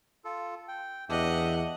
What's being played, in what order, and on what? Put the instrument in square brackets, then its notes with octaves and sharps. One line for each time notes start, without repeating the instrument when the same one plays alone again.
[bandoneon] F4 A4
G5
[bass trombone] E2 [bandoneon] D4 G4 E5 [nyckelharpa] D#5 F#5